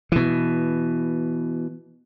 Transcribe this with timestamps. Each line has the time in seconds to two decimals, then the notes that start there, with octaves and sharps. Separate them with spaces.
0.12 B2 E3